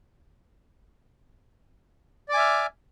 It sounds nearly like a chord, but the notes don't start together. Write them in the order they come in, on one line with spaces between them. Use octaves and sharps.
D5 D6 G#5 E5 F6